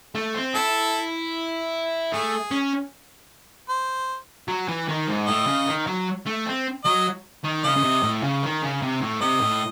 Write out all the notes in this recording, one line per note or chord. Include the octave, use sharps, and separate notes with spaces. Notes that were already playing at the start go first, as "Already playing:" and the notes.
A3
C4
E4 A4
A3 G#4
C#4
C5
F#3
E3
D#3
G#2
A2 D#5
C#3
D#3
F#3
A3
C4
F#3 D#5
D#3
C#3 D#5
C#3
C3
A2
C#3
D#3
C#3
C3
A2
C3 D#5
A2